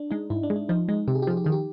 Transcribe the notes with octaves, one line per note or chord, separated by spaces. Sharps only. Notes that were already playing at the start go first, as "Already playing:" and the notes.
Already playing: D4
G#3 D#4
G#2 E4
D4
G#3
D4
F3 D#4
G#3 D#4
C3 G4
G#4
G4
F3 G#4
G4
D#3 G#4
G4